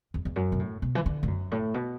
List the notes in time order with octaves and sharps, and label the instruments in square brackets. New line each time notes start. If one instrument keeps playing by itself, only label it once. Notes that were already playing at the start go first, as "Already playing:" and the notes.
[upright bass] E2
E2
F#2
B2
A2
B2
E3
D3
A2
F#2
A2
B2